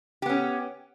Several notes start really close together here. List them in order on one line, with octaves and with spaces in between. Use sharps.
G4 B3 C#4